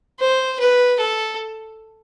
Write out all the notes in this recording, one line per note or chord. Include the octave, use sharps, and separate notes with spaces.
C5
B4
A4